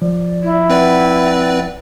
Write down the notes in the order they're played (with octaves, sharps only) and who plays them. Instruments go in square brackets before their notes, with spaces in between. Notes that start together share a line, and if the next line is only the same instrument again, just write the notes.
[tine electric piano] F3 [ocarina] D5
[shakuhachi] E4
[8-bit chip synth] C4 B4 D5 [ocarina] F#5